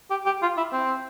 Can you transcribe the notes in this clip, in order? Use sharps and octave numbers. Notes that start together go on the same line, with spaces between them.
G4
G4
F4
E4
C4